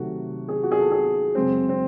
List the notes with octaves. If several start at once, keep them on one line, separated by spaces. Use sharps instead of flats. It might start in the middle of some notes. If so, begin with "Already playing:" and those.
Already playing: C3 D#3 F#3 A3 F#4
G#4
F#4
G#4
A4
G#4
F#2 C#3 G#3 C4
C4